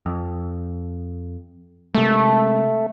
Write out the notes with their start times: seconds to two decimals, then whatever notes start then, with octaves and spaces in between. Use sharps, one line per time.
0.06 F2
1.95 C3 G#3 A3